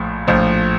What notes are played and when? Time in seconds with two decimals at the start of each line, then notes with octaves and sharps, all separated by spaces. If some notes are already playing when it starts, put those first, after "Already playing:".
Already playing: A#1 A2 F3
0.27 A#1 A2 F3